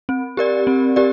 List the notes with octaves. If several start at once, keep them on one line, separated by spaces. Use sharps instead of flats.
C4
G4 A#4 D5
C4
G4 A#4 D5